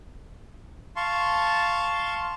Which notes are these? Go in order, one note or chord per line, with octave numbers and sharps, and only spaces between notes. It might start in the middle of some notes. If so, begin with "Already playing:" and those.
F5 A5 C6 C#6